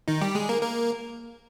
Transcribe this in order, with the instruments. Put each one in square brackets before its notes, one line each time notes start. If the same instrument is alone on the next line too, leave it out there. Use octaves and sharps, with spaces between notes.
[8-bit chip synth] D#3 D#4
G3 G4
G#3 G#4
A#3 A#4
A#3 A#4